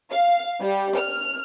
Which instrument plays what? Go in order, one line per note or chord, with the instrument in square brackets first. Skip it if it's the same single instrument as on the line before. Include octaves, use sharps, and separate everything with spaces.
[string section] F5
G3
F6